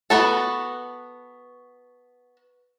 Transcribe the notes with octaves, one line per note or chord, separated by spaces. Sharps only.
B3 F#4 A4